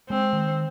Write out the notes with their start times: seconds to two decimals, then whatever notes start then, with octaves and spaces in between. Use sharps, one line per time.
0.10 G#3 C4
0.33 D#3